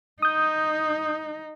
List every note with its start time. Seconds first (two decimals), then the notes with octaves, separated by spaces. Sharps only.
0.22 D#4 D#6 G6